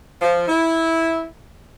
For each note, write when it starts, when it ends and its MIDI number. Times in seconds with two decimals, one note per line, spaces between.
0.21 0.46 53
0.48 1.26 64